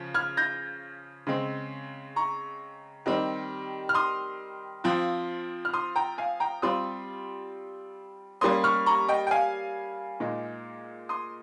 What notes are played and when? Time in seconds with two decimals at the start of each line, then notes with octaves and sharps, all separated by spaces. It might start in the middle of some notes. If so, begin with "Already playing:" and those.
Already playing: C#3 F3
0.14 F6 G#6
0.37 G6 A#6
1.27 C#3 G#3 C4
2.16 A#5 C#6
3.06 D#3 G3 C4 D#4
3.89 F6
3.95 C6 D#6
4.84 F3 C4 F4
5.65 F6
5.73 C6 D#6
5.96 G5 A#5
6.18 F5 G#5
6.40 G5 A#5
6.62 G3 C4 F4 C6 D#6
8.41 G3 A#3 C#4 C6 D#6
8.64 C#6 F6
8.86 A#5 C#6
9.09 D#5 G5
9.27 G5
9.31 F5 G#5
10.20 A#2 G#3 D#4
11.09 C6 D#6